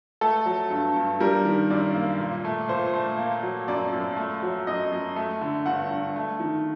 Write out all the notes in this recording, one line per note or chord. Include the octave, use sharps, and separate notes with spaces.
A3 A4
F#3
G2
G2
G3 A#4
D#3
F#2 D5
A#3
A#2
A3
A#2 C5
A3
A#3
F#3
F#2 D5
F#2
A3
F#3
F#2 D#5
F#2
A3
D3
G2 F#5
G2
A3
D#3